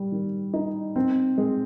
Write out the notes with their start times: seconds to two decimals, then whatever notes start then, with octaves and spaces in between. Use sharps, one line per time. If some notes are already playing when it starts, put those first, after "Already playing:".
Already playing: G3
0.12 D#3
0.54 D#4
0.96 C4
1.38 G#3